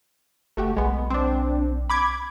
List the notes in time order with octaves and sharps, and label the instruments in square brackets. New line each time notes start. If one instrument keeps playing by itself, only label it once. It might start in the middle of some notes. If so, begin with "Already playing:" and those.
[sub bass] F#1 [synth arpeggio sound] A3 F#4 G4
[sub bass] B1 [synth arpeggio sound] G#3 B3
[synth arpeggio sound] C4 D4
B5 D6 G#6